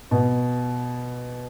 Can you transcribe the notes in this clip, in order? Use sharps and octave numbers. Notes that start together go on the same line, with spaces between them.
B2